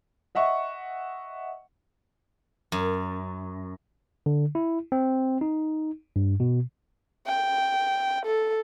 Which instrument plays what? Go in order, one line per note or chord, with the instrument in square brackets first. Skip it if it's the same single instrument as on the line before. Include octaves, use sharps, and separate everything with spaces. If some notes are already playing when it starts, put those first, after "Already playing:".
[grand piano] D#5 E5 F#5 C#6
[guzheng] F#2
[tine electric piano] D3
E4
C4
D#4
G2
B2
[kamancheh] G5
A4